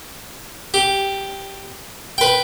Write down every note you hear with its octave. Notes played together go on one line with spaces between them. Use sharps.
G4
B4 G5